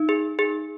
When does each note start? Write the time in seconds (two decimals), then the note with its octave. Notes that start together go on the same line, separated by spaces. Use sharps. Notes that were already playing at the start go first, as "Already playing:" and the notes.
Already playing: D#4
0.09 G#4
0.39 G#4